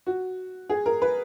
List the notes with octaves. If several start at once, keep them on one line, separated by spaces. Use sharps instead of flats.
F#4
G#4
A#4
B4